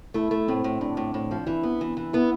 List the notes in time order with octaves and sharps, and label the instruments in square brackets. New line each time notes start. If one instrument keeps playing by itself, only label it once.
[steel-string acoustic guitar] A3 [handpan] E4
[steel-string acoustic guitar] A3
[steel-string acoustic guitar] A2 [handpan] C4
[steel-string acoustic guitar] A2
[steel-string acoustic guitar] A2 [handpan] D4
[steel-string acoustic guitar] A2
A2
F3
[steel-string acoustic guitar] E3 [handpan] E4
[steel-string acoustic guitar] B3
E3
E3
[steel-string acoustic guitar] B3 [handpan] E4